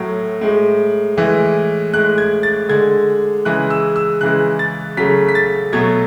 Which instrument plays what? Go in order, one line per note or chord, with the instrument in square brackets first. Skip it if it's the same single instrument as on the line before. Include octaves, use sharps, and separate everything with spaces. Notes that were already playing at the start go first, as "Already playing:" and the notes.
Already playing: [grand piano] A2 F#3 A3
A2 G#3
A2 E3 G#3
A2 G#3 F#6
G#6
A6
D3 G#3 G#6
C#3 E3 G#3 F#6
E6
E6
C#3 E3 G#3 F#6
A6
C#3 F#3 A3 B6
B6
A6
B2 F#3 A3 G#6